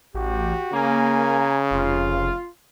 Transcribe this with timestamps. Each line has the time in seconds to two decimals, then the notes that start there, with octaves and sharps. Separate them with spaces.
0.14 A1 F#4 G4
0.73 C#3 A#3 G#5 A#5
1.71 F1 F4